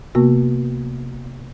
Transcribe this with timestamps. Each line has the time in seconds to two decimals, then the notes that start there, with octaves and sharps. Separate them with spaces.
0.15 C3 A#3 B3 F#4